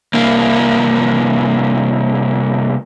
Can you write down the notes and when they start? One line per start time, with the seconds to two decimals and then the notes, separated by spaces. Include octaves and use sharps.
0.14 C2 A#3